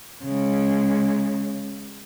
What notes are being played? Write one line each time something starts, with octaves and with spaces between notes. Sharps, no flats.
C#3 G#3